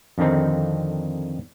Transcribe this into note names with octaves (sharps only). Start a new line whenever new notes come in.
F2 D3 D#3 C4 D#4